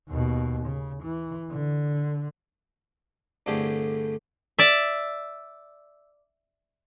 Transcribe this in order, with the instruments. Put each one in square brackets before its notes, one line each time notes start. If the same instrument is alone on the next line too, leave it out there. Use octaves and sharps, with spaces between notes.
[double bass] D#2 B2
C#3
E3
D3
[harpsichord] C2 G2 D3 A3 G4 G#4
[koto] D5 E5